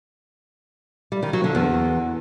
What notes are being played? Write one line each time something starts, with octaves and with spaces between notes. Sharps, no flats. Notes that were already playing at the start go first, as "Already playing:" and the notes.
G3
D#3
F#3
D3
E2